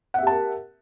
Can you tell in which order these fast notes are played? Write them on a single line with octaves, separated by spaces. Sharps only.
F#5 E5 G4 A5 A#4